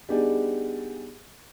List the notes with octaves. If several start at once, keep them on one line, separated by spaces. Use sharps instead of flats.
G3 B3 D4 D#4 G4 G#4